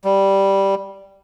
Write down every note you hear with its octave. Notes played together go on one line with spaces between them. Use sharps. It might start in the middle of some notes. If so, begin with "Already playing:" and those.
G3